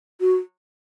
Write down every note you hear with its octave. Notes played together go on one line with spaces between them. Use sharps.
F#4